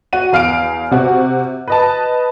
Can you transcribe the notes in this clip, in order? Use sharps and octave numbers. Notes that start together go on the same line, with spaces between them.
F#4 D#7
E2 F5 F6 D7
C3 F#4
B4 D#5 A5